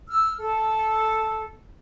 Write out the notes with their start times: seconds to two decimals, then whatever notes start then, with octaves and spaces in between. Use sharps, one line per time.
0.08 E6 F6
0.38 A4